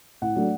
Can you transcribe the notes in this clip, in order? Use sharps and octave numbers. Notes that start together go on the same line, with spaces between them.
A2 F#5
F#3 A3 D4